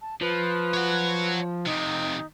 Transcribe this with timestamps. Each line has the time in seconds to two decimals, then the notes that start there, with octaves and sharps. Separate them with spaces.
0.01 A5
0.21 F3 B4
0.74 C#5 F#5
1.66 F2 C3 D#4